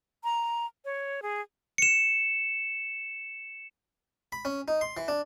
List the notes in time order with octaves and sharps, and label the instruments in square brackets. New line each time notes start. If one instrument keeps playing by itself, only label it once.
[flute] A#5
C#5
G#4
[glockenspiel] C#7 E7
[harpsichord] B5
C#4
D#4
C6
E3
D4